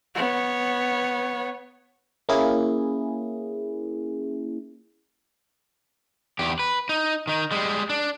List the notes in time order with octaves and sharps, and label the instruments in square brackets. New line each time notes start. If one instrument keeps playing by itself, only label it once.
[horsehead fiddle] B3 C#5
[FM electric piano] A#3 C#4 E4 G#4
[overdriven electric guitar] E2 G4
B4
D#4
D#3 D#4
G3 G#3
D4